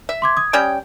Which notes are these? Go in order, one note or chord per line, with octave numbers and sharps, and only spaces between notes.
E5
C6 D6 G#6
D#6 G#6
G3 C#4 G5